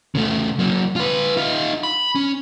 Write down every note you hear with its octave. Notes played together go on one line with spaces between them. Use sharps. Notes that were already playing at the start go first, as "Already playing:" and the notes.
C#3 A3
F#3 A#3
F4 B4
D#4 F4
B5
C#4